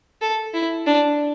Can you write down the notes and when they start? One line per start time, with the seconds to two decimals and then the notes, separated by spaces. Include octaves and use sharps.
0.21 A4
0.54 E4
0.87 D4